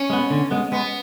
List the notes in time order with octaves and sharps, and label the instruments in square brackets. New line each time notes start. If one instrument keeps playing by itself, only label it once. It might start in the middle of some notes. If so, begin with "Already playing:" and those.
Already playing: [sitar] C#4
[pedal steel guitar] G#3 B3
D3
G#3 B3
[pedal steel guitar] G#3 [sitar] B3